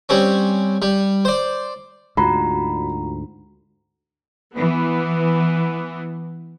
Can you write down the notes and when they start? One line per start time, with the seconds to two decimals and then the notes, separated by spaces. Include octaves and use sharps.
0.09 G3 C4 C#4
0.82 G3
1.25 C5 D5
2.17 D2 G#2 F4 F#4 A#5 B5
4.54 E3 B3